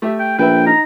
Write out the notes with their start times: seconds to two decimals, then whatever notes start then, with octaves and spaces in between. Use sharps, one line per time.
0.02 A3 G4 E5
0.19 G5
0.39 A#1 B4 E5 G5
0.66 D#4 A#5